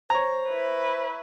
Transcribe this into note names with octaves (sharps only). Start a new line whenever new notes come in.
C5 C#5 A#5
E4 B4